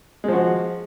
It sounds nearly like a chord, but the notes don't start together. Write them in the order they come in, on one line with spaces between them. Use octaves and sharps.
G#3 F3 F#4